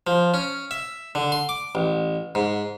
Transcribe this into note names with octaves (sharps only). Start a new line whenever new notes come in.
F3
C#4
E5
D3
C6
D6
A1
G#2